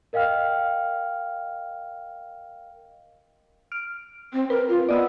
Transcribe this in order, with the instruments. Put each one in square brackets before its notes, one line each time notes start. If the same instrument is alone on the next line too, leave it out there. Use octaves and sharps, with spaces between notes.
[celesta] A#4 D#5 F5 G5 F6
[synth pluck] F6 D7
[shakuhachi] C4
[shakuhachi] A#4 [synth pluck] B4
[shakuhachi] F4
[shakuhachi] B3 [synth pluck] D5 D#5 E6